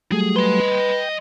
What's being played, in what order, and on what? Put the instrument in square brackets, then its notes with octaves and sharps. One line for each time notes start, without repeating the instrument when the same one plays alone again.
[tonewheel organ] F#3 G3 A3 [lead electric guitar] G#4
[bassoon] B4 [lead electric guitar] D#5 C6
[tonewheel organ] G5